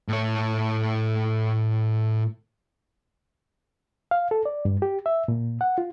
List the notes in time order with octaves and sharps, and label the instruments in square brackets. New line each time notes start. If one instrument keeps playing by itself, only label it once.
[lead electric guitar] A2 C#5
[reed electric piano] F5
A4
D5
G2
G4
E5
A#2
F#5
F4